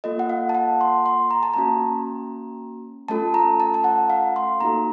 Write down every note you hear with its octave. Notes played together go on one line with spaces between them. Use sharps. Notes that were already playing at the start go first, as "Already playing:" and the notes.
A#3 F4 A4 D#5
F#5
F5
A5
F#5
C6
C6
A#5
A5
A#3 C#4 F#4 A#5
A3 C#4 F4 A4 A5
A#5
A5
A5
F#5
F5
C6
A#3 D#4 F#4 A4 A#5